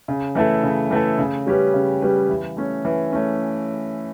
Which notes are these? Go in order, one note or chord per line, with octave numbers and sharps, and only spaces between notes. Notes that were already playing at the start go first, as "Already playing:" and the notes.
C#3
E3 A3 E4 A4
C#3
E3 A3 E4 A4
C#3
G3 C#4 G4 B4
C#3
G3 C#4 G4 B4
E3
A3 C#4
E3
A3 C#4